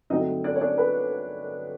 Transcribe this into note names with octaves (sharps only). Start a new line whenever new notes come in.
G2 D3 F#3 A3 C4 D#4 D#5
D4 D5
C#5
D4 D5
B4